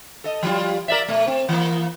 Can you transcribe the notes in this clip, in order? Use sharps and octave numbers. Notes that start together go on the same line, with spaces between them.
A4 D#5
F3 G3 F4
A#4 D5 E5
B2 A3
C4
E3 A#3